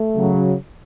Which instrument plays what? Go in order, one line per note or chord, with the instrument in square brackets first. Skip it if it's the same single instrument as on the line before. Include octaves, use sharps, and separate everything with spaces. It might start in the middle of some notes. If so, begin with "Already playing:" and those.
Already playing: [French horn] A3
[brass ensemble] C#3 F#3